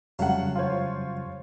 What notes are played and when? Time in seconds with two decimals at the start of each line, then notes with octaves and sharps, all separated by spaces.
0.19 F2 C#3 F#3 G3 A3 F5 F#5
0.55 F4 C5 C#5